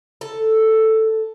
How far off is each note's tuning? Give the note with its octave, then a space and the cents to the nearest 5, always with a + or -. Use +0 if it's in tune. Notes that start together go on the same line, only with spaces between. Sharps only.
A4 +5